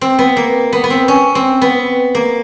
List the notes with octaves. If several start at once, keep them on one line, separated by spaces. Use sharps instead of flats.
C4
B3
A#3
B3
B3
C4
C#4
C4
B3
A#3